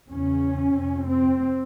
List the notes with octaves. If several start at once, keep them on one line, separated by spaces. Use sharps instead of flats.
E2 C#3 C#4
F2 C3
C4